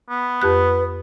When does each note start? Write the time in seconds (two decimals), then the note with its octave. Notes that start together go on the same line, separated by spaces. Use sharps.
0.10 B3
0.42 F2 G4 B4 F#6